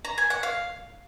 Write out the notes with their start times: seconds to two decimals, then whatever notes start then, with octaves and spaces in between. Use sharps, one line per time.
0.05 A#5
0.18 G#5
0.30 F#5
0.43 F5